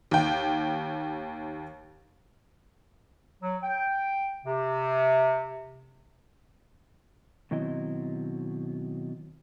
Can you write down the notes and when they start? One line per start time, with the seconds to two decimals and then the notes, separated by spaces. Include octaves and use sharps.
0.11 D#2 G5
3.42 F#3
3.63 G5
4.45 C3
7.51 B2 D#3 F#3 C4 E4 D#5